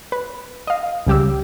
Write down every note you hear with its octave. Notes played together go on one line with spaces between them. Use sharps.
B4
D#5 F5
C#2 C#3 G3 G4 D6 E6